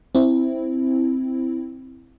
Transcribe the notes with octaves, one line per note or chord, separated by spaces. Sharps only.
C4 E4